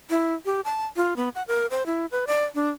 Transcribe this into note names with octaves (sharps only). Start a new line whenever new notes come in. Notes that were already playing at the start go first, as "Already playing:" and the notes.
E4
G4
A5
F4
B3
F#5
A#4
C5
E4
B4
D5
D4